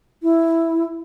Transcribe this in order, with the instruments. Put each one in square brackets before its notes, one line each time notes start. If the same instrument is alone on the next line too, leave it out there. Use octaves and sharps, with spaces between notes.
[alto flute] E4